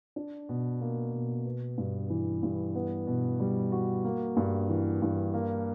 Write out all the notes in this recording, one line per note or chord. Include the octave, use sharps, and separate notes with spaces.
D4
B2
A#3
B2
B3
G2
E3
G2
B3
B2
G3
F#4
A#3
G2
E3
G2
A#3